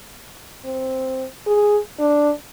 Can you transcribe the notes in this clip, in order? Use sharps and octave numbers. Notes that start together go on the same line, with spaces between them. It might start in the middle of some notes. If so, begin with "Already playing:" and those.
C4
G#4
D4